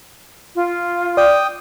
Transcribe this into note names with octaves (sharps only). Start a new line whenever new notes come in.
F4
D5 G5 D#6